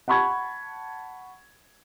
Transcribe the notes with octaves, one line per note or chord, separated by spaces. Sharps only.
F#5 A5 B5 C#6 G#6